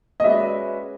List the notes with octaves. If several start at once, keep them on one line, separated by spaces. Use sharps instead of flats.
D#5
G#3 C#4 F#4 B4 D5 E5